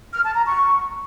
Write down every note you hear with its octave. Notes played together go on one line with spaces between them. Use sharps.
F6
A5
A#5
C#6